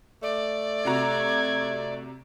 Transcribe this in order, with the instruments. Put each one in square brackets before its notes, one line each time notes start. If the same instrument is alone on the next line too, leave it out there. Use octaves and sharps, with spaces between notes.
[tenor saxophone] A3 [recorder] D5
[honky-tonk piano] C3 F#4 A#5 [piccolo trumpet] G#6